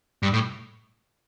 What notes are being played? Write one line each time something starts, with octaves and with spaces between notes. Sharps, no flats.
G2
A2